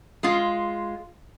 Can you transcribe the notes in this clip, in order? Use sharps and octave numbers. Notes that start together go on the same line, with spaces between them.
G#3 F4